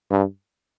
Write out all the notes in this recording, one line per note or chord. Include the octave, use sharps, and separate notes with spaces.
G2